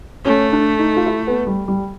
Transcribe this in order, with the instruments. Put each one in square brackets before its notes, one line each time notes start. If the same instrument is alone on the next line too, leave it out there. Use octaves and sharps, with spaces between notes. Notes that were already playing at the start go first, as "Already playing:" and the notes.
[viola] A3 [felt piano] C#4
[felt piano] D4
D#4
F4
E4
B3
G3
G3